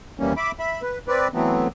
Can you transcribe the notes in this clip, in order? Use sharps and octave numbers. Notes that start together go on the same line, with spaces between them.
D#2 E3 G3 A#3 C#4
E5 B5 D6
E5 B5
B4
C4 B4 D5
E3 F#3 A3 B3 C4